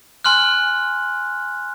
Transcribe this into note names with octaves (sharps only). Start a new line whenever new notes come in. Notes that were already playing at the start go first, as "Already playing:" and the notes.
G#5 C6 F6 F#6